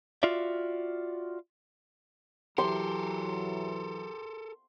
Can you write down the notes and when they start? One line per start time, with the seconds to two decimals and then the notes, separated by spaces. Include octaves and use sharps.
0.23 F4 F#4 D5 E5
2.58 E3 F#3 G4 A4 A#4 C6